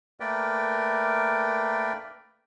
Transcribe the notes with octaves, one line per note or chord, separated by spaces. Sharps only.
A3 A#3 A#4 B4 D5 G5